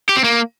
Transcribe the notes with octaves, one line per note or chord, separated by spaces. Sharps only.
G4
C4
A#3